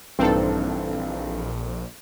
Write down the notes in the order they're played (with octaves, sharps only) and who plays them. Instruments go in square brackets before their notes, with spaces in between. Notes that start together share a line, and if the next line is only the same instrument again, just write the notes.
[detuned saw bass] A#1 [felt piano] G2 E3 D#4 [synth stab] C4 A4